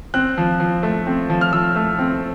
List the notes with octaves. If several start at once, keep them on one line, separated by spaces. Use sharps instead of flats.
C4 F#6
F3
F3
A3
C4
F3
F6
F3 E6
A3
C4